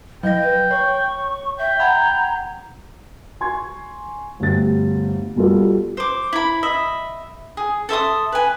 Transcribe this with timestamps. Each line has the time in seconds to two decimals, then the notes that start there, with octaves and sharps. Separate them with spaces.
0.23 F#3 D#5 G5 A#6
0.42 B4
0.71 C#5 C#6
1.58 E5 G5
1.79 F#5 A#5 B5 G#6
3.41 G#5 C6 C#6 G#6
4.40 G1 D2 G4 A6
5.36 B2 G3 F4 A4
5.97 C5 D6
6.33 E4 B5
6.63 D#5 E5 B5
7.57 G#4
7.89 A4 E5 C6 D#6
8.32 B4 G#5